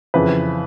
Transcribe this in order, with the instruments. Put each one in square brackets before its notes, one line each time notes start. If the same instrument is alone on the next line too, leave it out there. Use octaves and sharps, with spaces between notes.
[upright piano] F2 C#3 E3 B4